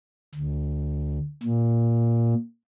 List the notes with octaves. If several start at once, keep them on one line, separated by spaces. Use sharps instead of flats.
D2
A#2